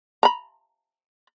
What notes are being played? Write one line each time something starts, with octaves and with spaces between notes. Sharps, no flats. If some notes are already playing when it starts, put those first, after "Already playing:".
A#5 B5